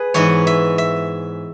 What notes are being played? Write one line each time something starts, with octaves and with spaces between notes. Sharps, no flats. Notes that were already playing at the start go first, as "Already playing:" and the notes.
Already playing: G#4 B4
G#2 E3 B3 C#5
E5
E5